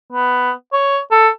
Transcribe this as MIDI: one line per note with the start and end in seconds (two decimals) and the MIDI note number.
0.12 0.52 59
0.73 0.99 73
1.11 1.28 69